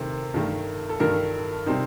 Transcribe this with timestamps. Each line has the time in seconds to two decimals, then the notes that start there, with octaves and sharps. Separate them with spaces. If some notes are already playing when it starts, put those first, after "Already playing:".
Already playing: C3 D#3 A3 C4
0.34 G2 D#3 A3
0.89 A4
1.00 G2 D#3 A3 A#4
1.66 C3 G3 C4 D#4